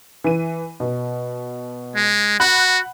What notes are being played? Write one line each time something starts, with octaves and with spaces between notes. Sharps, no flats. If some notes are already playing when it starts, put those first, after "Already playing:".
E3 D#7
B2
G#3
F#4 F#5 B5 F#6